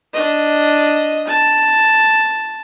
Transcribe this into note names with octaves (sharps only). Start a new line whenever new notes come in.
D4 D#5
A5